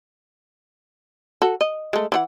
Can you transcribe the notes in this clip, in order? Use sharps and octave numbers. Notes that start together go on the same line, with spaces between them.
F#4 A4
D#5
G#3 A3
E3 E4 F#5